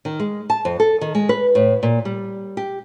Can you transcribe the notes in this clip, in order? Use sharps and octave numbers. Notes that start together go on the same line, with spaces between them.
D#3
G#3
A5
F2
A4
D#3
G#3
B4
A2
A#2
G3
G4